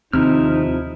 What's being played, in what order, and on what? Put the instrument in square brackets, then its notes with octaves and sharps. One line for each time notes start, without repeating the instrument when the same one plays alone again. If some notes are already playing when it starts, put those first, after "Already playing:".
[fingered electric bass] D#2 C4 [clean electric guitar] C3 [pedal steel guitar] F3 E4 F6 [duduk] D#4